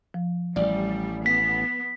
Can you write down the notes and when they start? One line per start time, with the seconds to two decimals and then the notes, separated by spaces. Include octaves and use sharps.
0.14 F3
0.56 A1 G3 D5
1.26 B3 B6